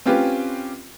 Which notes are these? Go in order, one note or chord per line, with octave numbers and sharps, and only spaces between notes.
C4 C#4 F4 G4 B4